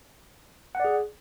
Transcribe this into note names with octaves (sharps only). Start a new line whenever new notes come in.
G#4 D5 F#5